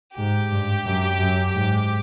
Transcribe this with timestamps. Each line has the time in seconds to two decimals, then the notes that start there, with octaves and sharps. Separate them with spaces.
0.16 G#2 G4
0.51 G2
0.85 F#2
1.19 F#2
1.53 G#2